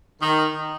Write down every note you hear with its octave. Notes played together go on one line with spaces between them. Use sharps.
D#3